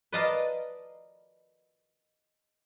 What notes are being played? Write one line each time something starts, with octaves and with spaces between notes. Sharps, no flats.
B4 D5 D#5 F5 A5 A#5